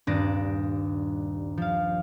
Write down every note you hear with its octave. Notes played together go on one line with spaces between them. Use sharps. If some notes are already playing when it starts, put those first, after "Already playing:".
D#1 G2 D4 D6 D#6 A#6
F3 F5